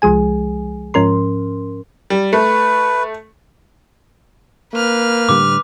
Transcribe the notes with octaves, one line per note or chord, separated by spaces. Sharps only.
C2 F3 G#3 G#4 G#5
G#2 F3 C#4 A#4 C6
G3
A3 B4
A#3 B4 F6
A2 D3 G3 D6